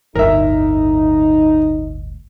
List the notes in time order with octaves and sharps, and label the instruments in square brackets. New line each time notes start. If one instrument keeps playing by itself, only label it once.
[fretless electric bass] G1 D2 A2 [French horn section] D#4 [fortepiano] A#4 E5